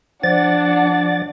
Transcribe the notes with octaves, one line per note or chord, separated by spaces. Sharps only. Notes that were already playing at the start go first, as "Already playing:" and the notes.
F3 D4 D5 F#5 A6